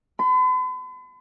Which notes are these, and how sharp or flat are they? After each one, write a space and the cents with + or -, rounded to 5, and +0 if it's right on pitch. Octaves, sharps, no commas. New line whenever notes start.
B5 +45